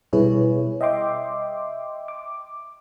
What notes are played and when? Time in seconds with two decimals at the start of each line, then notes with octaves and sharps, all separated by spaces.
0.13 B2 G3 E4 G#4 B4 C#5
0.81 D#5 E5 G5 C6 D6
2.08 D6